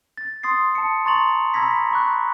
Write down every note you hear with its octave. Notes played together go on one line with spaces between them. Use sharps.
A6
C6 D#6 A6 C7
A5 C#7
A#5 C6 C#6 A6 F7 F#7
A#5 B5 E6 G#6 A#6 B6
B5 C#6 F#6